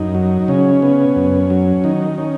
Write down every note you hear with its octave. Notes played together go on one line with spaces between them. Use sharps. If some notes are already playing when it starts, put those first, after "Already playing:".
Already playing: F#2 D#4
F#3
C#3 C#4
B3
F#2
F#3
D#3 D#4
C#4